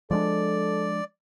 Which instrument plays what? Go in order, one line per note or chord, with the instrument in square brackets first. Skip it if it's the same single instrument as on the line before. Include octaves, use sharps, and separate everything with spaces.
[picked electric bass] F3 G#3 D4 [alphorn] A4 [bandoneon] D5